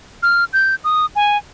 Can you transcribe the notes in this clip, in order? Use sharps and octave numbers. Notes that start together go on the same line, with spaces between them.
F6
G6
D#6
G#5